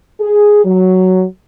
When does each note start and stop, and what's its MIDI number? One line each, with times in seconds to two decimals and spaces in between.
0.20 0.63 68
0.65 1.24 54